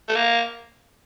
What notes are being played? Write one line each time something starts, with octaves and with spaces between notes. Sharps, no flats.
A3
A#3